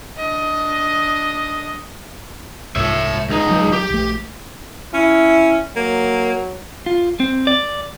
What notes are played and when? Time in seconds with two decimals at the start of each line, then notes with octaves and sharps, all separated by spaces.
0.17 D4 D#5
2.76 C2 G#2 C#5 E5
3.29 C#2 D#4
3.51 F#3
3.73 G4
3.90 A#1 A3
4.94 C#4 E4
5.76 F#3 A#3
6.86 F4
7.20 C4
7.47 D5